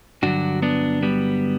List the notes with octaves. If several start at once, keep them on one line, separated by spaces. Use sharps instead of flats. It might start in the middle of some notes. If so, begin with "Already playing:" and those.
G2 D3 F#3 D4 F#4
B3 D4
G3 B3